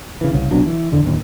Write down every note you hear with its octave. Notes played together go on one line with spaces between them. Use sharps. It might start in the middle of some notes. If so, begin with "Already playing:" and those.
C#3 E3
C2 C#3
C2 B2 F#3 D4
E3
E2 D3
D1 D#2